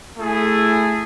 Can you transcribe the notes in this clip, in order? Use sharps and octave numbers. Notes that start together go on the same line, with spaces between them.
A3 E4 G#4